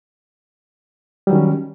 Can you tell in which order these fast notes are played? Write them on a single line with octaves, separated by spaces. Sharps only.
G3 F#3 D#3 C#4